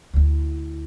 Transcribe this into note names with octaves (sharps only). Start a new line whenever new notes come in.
D2 E4